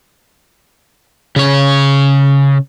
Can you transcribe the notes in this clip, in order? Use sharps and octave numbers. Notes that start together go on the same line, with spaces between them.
C#3 C#5